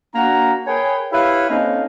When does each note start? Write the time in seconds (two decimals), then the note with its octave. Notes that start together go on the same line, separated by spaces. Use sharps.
0.15 A#3 D4 F#4 A#5
0.67 G#4 A#4 B4 C#5 G5 G#5
1.12 E4 G4 B4 C#5 E5 F5
1.50 A#3 C4 C#4 D#4 A4 F5